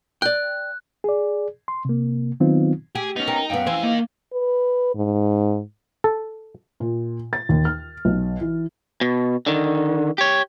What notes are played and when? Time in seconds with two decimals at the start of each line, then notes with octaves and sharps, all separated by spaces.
0.22 D5 G5 F#6
1.04 G#4 D5
1.68 C6
1.85 C3 A#3
2.40 D#3 F#3 B3 C4 D#4 F4
2.95 G4 G#4
3.16 B3 C#4 D#4
3.28 A#4 G5
3.50 F#2 B3 C#4 F5 G5
3.67 F2 E3 C5 G#5
3.83 A#3 A#4 D#5
4.33 B4
4.95 G#2
6.04 A4
6.80 A#2
7.33 A6
7.49 D#2
7.65 F6
8.05 B1
8.41 E3
9.01 B2
9.46 D3 D#3
10.18 G4 C#5